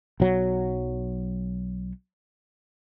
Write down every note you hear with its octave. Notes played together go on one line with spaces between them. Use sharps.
B1 F#3